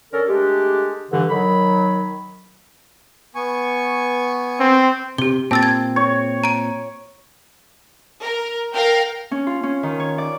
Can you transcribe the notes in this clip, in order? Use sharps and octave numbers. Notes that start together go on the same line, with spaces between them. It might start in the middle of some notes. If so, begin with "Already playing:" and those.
D3 C#4 A4 A#4
G#3 A3 D4 G4
G2 D3 E3
D#3 F#3 B5
B3 G#5 C#6
C4
C3 G4 G7
A#2 C4 A5 E6 A6
G#6
C#5
A#5 D7
A#4
A#4 F5 G5
C#4
F4
C#4
D#3
C#5
D5